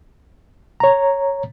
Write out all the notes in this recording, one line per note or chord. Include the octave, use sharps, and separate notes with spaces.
C#5 A#5